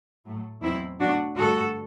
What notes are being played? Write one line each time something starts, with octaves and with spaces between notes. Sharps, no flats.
A2 F#3 A3
E2 B2 F#3 C4 E4
B2 F#3 A3 D4 F#4
G2 D3 A3 F#4 A4